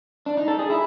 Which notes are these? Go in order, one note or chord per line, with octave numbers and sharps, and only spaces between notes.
D4
D#4
A4
G#4
E4